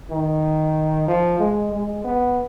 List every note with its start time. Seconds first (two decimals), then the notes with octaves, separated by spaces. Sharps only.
0.11 D#3
1.08 F3
1.39 G#3
1.73 G#3
2.04 B3